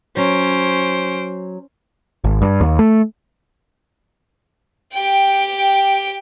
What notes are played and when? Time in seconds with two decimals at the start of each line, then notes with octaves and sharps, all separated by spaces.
0.17 F#3 C#4 C5 D7
2.24 G#1
2.42 G2
2.61 D#2
2.79 A3
4.93 G4 G5